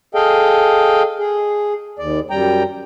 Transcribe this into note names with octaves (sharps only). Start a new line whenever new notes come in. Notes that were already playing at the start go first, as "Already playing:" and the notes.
G#4 A4 D#5 F5 G5
G#4
D#2 D5
F#2 G3 G5 A#5